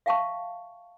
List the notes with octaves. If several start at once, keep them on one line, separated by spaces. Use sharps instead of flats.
E5 F5 G5 A5 C#6